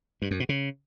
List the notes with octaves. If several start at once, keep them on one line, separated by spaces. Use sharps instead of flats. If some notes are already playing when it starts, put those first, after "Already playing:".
G2
F#2
B2
C#3